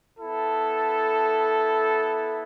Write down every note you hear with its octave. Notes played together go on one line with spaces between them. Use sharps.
B3 E4 A4